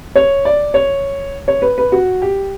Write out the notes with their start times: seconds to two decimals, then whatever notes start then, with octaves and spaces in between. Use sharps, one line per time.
0.16 C#5
0.45 D5
0.74 C#5
1.48 C#5
1.62 B4
1.78 B4
1.92 F#4
2.22 G4